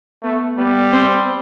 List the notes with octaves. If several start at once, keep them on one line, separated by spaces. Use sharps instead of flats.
A3 B3
G3 B3
C4